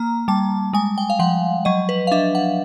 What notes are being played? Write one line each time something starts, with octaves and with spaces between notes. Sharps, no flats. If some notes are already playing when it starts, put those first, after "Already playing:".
Already playing: A#3 A#5
G3 A5
G#3 G#5
G5
F5
F3 F#5
F#3 D#5
B4
F5
D4 E5
F#5